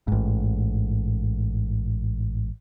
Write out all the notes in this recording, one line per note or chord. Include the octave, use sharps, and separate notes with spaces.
A1 G#2